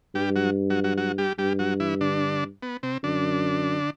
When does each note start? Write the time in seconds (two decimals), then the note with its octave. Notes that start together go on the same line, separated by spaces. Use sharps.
0.15 G2 G3 G4
0.36 F#3 F#4
0.70 F#3 F#4
0.84 F#3 F#4
0.97 F#3 F#4
1.18 G3 G4
1.38 G2 G3 G4
1.59 F#3 F#4
1.80 E3 E4
2.01 D3 D4
2.62 B3
2.83 C3 C4
3.03 F#2 D3 D4